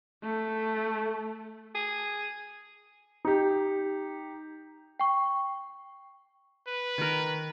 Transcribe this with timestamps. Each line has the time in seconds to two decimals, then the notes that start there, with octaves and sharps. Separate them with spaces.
0.23 A3
1.75 G#4
3.25 D#4 G4
4.99 G5 C#6
6.68 B4
6.98 D#3 A#4